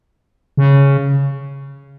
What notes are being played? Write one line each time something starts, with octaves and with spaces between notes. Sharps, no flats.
C#3